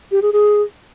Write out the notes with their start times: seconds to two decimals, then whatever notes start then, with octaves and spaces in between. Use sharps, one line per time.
0.11 G4
0.22 G#4
0.33 G#4